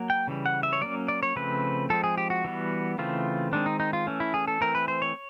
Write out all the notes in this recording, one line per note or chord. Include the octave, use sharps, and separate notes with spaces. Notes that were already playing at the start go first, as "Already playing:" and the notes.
Already playing: F#3 A#3
G5
C#3 E3 G3
F#5
E5
C#5
F#3 A#3 C#4 D5
D5
C#5
C#3 F3 A3 C4 B4
F3 G#3 C4 A4
G#4
G4
F#4
E3 G3 B3
C#3 E3 A3 C4 F4
D#3 G#3 C4 D4
D#4
D#4
F4
E3 A3 C#4
E4
G#4
A4
E3 A3 C4 A#4
B4
C5
C#5